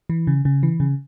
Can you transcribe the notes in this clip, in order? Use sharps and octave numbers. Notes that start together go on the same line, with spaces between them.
E3
C#3
C#3
E3
C#3